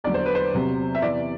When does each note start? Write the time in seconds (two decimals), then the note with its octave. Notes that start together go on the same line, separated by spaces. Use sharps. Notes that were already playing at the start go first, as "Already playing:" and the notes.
0.04 E2 D3 F#3 D5
0.14 C5
0.26 B4
0.35 C5
0.53 E2 C3 F#3
0.95 E5
1.02 E2 C3 E3 D5